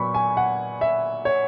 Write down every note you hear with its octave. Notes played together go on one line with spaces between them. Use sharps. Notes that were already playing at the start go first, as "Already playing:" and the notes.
Already playing: A#2 F#3 B3 B5 C#6
G#5
F#5
E5
C#5